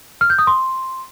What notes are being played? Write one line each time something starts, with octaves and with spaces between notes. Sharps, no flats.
F6
G6
D#6
C6